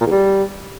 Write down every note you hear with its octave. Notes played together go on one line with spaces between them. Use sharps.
A#2
E2
G3